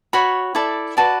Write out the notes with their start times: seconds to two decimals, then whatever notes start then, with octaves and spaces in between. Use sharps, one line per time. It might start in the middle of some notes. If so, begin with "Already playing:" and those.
0.13 F#4 C#5 B5
0.55 E4 A4 D5
0.97 F#4 B4 D5 A5